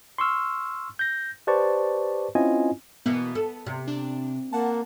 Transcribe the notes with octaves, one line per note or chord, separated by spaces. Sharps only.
C6 C#6 E6 F6
G6 A#6
G4 B4 C5 D5 A5 C#6
C4 C#4 E4 F4 D#5 G#5
B2 E3 A#3 B3
A4
C3
D4
A#3 F#5 A5